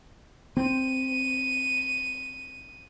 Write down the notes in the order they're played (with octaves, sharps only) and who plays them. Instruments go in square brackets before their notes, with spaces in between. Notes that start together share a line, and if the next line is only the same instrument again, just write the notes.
[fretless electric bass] C4 [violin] D#7